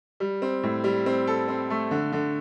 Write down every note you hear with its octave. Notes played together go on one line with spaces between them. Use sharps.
G3
C4
A2
G3
C4
A4
C4
A3
D3
D3